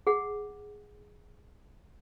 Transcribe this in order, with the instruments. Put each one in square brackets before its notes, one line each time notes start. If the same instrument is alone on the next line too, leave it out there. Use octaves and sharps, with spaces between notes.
[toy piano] G#4 F#5